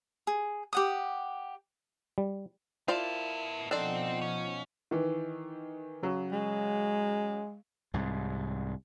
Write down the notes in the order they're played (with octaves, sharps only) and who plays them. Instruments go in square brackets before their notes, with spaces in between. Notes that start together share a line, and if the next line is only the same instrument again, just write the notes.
[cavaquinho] G#4
G4 F#5 D#6
[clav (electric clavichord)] G3
[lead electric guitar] B3 A5 [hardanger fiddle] E4 A#4 [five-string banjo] F4 C5 D5
[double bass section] B2 F3 [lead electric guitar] C4 [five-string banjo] D4 A4 D5 [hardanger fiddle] D#4 F#5
[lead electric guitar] C#4
[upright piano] D#3 E3
C#3 F#3
[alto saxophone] G#3
[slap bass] C2 G#2